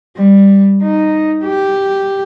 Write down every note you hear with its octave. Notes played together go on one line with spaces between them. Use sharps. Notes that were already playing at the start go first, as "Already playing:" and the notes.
G3
D#4
G4